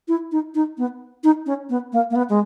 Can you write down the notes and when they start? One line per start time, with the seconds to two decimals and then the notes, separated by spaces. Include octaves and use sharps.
0.08 E4
0.32 D#4
0.55 D#4
0.78 B3
1.24 D#4
1.46 C#4
1.70 B3
1.93 A#3
2.10 A#3
2.16 B3
2.29 G#3